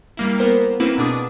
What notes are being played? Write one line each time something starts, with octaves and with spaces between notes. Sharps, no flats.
G3 A#3 E4
A#3 B3 A#4 C5
A#3 C4 E4 F#4 B4
B2 D4 G#4 D6 D#6